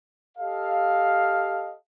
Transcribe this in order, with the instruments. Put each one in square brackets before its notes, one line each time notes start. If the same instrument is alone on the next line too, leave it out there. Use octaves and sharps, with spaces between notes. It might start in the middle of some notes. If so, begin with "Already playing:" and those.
[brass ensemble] G4 A4 D#5 F5